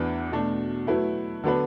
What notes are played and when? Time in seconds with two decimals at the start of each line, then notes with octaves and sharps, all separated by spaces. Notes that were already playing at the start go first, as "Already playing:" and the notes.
Already playing: E2 E3 D4 F#4 B4
0.32 B2 A3 D4
0.87 F#3 A3 E4 B4
1.44 D3 F#3 B3 D4 B4